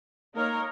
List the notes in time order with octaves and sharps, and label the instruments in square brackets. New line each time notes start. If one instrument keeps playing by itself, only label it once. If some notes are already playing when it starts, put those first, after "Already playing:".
[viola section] A#3 D#4 A#4 C#5